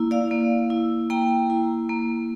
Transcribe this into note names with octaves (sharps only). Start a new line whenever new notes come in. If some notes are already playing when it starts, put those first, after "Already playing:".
Already playing: A#3 E4
D5 F5
A#3
E4
A#3 G5 A#5
E4
A#3